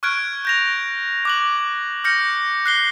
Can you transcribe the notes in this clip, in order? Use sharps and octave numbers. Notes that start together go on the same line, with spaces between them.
C#6 F6 F#6 G#6 D7
G6 A#6 F7
D6 F#6 F#7
F6 G6 A#6 C#7
F#6 C7 G7